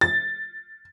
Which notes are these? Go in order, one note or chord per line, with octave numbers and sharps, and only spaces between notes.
A6